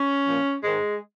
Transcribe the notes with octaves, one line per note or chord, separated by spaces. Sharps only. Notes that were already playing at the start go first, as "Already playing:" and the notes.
Already playing: C#4
A#2 F3
G#2 D#3 G#3